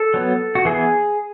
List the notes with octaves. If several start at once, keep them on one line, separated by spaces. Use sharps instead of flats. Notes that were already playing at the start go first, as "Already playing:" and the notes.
Already playing: A4
F#3 B3
F#4
E3 B3 G#4